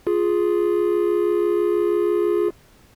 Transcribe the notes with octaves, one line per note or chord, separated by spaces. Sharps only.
F4 G#4